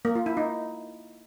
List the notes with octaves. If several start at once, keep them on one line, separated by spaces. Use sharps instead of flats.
A#3
F4
E4
D#4